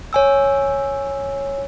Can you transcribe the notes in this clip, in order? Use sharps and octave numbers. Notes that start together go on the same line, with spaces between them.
C#5 G#5 E6